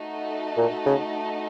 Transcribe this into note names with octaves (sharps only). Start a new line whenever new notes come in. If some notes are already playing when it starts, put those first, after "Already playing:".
Already playing: A3 D#4 F#4 A4 D#5
A#2
C#3